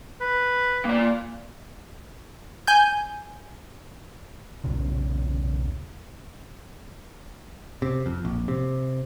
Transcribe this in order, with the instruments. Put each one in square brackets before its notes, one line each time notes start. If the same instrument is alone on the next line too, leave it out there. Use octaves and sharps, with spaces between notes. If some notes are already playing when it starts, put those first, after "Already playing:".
[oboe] B4
[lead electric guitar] A#3 D5
[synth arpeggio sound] G#5 G6
[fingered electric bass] B1 E2 A#2 C#3
[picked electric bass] C3
F2
A#1
C3